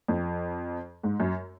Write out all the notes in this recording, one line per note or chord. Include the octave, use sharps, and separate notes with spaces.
F2
G#2
F#2